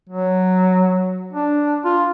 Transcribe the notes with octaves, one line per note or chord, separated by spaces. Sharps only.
F#3
D4
F4